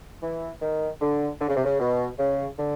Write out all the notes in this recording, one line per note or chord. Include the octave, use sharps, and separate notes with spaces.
E3
D#3
D3
D3
C#3
C3
C#3
B2
C#3
D3